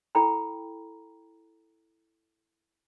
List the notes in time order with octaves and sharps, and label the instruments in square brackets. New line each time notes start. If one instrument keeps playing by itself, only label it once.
[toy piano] E4 A4 G5 A#5 B5